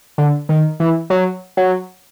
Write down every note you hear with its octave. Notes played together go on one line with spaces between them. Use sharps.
D3
D#3
E3
F#3
F#3